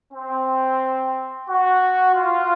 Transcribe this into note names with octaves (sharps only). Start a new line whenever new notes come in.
C4
F#4
F4